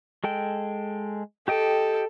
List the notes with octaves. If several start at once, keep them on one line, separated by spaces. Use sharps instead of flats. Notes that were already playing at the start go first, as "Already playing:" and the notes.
G#3 A4 G5
G4 A4 D#5 G5